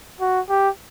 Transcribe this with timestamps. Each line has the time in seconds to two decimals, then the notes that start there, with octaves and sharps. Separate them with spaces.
0.21 F#4
0.49 G4